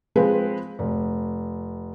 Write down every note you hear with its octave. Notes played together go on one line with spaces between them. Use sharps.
F3 G#3 C4 G#4 B4
F1